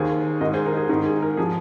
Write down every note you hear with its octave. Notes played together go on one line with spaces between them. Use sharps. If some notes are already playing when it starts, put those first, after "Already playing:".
Already playing: D#2 D#3 G#4 C5
G#2 D#3 A#4 D#5
G#4 C5
A#4
G#4
G#2 D#3 A#4
G#4
A#4
F3 G#4